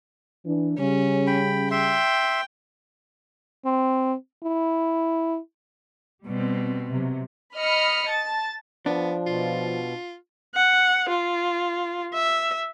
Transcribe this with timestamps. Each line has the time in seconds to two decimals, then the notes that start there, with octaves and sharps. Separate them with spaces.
0.46 E3 D4
0.78 C#3 G3 C#4
1.27 G5 B5
1.71 E5 G5 C6
3.65 C4
4.44 E4
6.26 B2 G3 C4
6.91 C3 F#3
7.55 D#5 B5 F6 C#7
8.11 A5 A6
8.86 F3 B3 D4
9.26 B2 F4
10.55 F#5
11.09 F4
12.13 E5